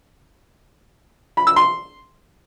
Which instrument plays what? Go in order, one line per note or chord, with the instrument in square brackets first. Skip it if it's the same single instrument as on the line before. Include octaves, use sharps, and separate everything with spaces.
[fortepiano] B5
E6
C6